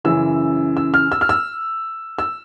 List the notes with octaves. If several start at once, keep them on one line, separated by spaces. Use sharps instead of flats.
F#2 C#3 E3 E6
E6
F6
E6
F6
E6
E6